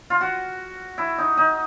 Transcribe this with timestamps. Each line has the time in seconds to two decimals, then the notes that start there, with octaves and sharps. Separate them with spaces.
0.10 F4
0.21 F#4
0.98 E4
1.18 D#4
1.37 D#4